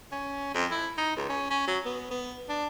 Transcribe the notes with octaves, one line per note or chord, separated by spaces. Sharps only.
C#4
F2
E4
D#4
C#2
C#4
C#4
F#3
B3
B3
D4